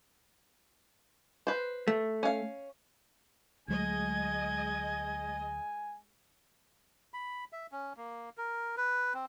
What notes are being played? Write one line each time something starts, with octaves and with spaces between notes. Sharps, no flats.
B4 C5
A3
C#4 F5
D2 F#3 G#3 A3 D#5 G#5 G#6
B5
E5
C#4
A#3
A#4
B4
C4